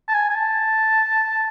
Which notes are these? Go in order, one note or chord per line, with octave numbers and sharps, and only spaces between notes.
A5
G#5
G#5
A5